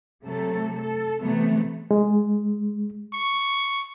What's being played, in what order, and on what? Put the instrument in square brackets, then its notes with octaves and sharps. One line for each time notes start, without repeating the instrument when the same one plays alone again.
[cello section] C3 F#3 A3 A4
A4
C3 E3 F#3 A3 B3
[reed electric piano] G#3
[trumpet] C#6